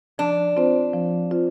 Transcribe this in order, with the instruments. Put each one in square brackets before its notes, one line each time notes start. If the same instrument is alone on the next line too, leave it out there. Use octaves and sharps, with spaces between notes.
[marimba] F3 [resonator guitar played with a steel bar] D4
[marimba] C4 F4 C5
F3
C4 F4 C5